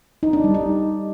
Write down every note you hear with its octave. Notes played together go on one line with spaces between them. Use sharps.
D#4
D4
G3
D#4